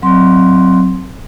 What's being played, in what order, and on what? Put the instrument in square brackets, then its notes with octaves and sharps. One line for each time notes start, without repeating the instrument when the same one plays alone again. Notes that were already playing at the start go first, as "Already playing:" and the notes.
[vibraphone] F#3 C4 C6